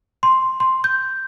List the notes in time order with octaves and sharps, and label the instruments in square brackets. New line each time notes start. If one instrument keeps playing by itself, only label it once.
[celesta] C6
C6
G6